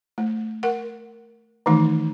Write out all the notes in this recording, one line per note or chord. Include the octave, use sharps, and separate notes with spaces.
A3
A#4 F#5
D#3 E3 A3 D#4